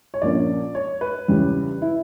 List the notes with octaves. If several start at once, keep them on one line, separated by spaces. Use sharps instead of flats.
C#5
A#1 A#2 A#3 C#4 D5
C#5
B4
E2 C#3 E3 G3 C#4
E4